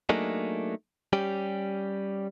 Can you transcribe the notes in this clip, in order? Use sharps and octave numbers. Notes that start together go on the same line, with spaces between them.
F#3 A3 A#3 D4 D#4 G#4
G3 C#4 G4